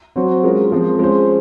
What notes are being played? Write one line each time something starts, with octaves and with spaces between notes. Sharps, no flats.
F#3 C4 F#4 C5
G#3 C#4 F4 A#4
F3 G#3 C4
G#3 C#4 F4 C5